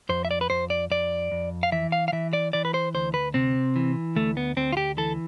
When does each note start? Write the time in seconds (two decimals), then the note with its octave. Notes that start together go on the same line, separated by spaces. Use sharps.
0.09 F2 C5
0.25 E5
0.31 D5
0.41 B4
0.50 F2 C5
0.70 D5
0.90 F2 D5
1.32 F2
1.63 F5
1.72 E3 E5
1.92 F5
2.08 F5
2.12 E3 E5
2.33 D5
2.53 E3 D5
2.65 B4
2.74 C5
2.94 D2 C5
3.14 B4
3.34 C3 C4
3.76 E3
4.16 D2 A3
4.37 B3
4.57 D2 C4
4.72 F4
4.77 G4
4.97 E3 A4